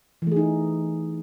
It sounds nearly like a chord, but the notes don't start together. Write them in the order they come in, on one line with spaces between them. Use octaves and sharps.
E3 A3 G#4 D#4